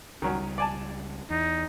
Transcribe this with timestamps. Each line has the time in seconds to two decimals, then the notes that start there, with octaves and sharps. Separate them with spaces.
0.22 C#2 D#3 F#3 G3 C#4
0.58 D5 G#5 A5
1.30 E2 D#4